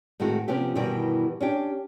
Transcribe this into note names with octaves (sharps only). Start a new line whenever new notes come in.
A2 D#3 G#3 C4 F#4
C3 F3 B3 C#4 F4 G4
G2 B2 D#3 E3 G3
C#4 D4 G4